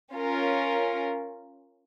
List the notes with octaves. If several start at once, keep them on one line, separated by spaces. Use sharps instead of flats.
C#4 F4 A#4